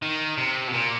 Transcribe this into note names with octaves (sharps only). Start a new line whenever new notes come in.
D#3
C3
B2
A#2